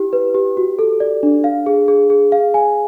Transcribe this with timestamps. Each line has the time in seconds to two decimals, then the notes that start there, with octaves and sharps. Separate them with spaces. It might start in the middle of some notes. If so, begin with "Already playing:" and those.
Already playing: E4 G4
0.13 B4
0.34 G4
0.57 F#4
0.79 A4
1.00 D5
1.23 D4
1.44 F5
1.66 G#4
1.88 G#4
2.10 G#4
2.32 F5
2.54 G#5